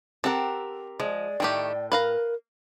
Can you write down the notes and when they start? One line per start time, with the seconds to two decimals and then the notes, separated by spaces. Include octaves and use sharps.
0.24 C4 G4 A4 A#4 F#5
1.00 F3 G#3 D5
1.40 A2 D#3 A3 G4 G5
1.92 A#4 B4 F5 A#5